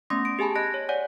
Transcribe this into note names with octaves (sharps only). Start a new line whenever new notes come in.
A3 B3 C#4 C6 D#6 A#6
D7
G4 G#4 G#5 A5 B5
D#5 F#6 A#6 D7
C#5
C#5 D5 F#5 G#5